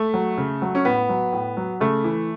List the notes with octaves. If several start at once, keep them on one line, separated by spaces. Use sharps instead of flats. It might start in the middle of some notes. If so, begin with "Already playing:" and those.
Already playing: A3
F#3
C#3
F#3
C#4
A2 B3
F#3
A2
F#3
C#3 A3
E3